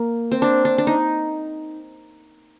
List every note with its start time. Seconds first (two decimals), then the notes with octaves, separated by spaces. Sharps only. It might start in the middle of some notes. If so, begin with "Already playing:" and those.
Already playing: A#3
0.31 C4
0.42 D4
0.65 D4
0.78 D4
0.87 D#4